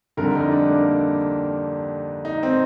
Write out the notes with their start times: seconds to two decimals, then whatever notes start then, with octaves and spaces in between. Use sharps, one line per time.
0.17 F2 D3 G3 A#4
0.35 D#4
0.52 D4
0.70 A#3
2.25 D#4
2.43 C4